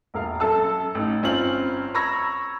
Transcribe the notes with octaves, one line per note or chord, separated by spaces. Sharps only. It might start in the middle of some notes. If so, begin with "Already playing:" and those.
E1 A#1 A#4 F5
F#2 A4 A5 E6
A1 D#4
G1 C4 C#4 F4 F#7
A#5 B5 C#6 E6 G#6 A#6